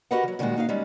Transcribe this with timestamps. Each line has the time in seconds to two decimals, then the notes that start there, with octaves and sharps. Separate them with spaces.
0.11 F#4 G4 A#4 B4 D#5 F#5
0.23 D#3 F#3
0.39 A#2 D3 D#3 G3 G#3 F#4
0.57 A#3 D#4 F#4 F5
0.69 G3 G#3 C#4 D#4